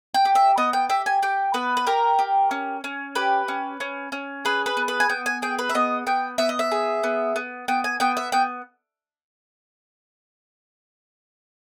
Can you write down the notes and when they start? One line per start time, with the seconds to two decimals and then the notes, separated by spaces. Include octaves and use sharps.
0.14 G5
0.25 G4
0.35 E5
0.58 B3 D#5
0.73 G5
0.89 G4 E5
1.06 G#5
1.22 G4 G5
1.54 B3 B4
1.77 B4
1.87 G4 A#4
2.19 G4
2.51 C#4
2.84 C#4
3.15 G4 B4
3.48 C#4
3.80 C#4
4.12 C#4
4.45 G#4 B4
4.66 B4
4.77 B3
4.88 B4
5.00 G#5
5.09 B3 G5
5.26 G#5
5.42 G#4 G5
5.59 B4
5.69 E5
5.75 B3 D#5
6.07 B3 G5
6.38 B3 E5
6.49 D#5
6.59 E5
6.71 G#4
7.03 B3
7.36 B3
7.68 B3 G5
7.84 G#5
8.00 B3 G5
8.17 E5
8.32 B3 G5